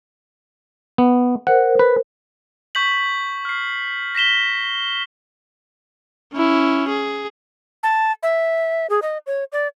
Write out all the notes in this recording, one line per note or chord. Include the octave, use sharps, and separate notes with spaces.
B3
A#4 C5 F#5
B4
C#6 G6 B6 F#7
F6 C7
A#6 B6 E7 G7
C#4 E4
G#4
A5
E5
G#4
D#5
C#5
D5